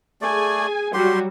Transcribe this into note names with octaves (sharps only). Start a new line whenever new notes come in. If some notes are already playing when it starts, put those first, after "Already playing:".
A3 G#4 D5 G#5
F#3 G3 F#4 G4 C6